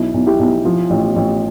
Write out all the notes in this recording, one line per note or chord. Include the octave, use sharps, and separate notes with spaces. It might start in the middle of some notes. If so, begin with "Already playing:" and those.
Already playing: B1 E4
B1
E4 G4
B1
F3
A1
A1